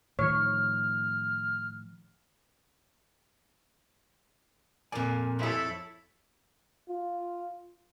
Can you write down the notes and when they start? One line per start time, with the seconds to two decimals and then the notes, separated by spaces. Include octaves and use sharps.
0.19 A2 D#3 F3 C#5 F6
4.92 F2 A#2 A#4 D5 G#5
5.39 C4 E4 A4 C#5
6.89 F4